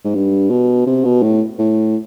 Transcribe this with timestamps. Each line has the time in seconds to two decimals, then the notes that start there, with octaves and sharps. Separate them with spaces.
0.04 G#2
0.15 G2
0.50 B2
0.86 C3
1.05 B2
1.23 A2
1.59 A2